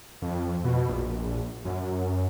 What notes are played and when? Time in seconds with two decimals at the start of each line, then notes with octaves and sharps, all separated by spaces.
0.22 F2
0.64 B2
0.89 A#1
1.65 F#2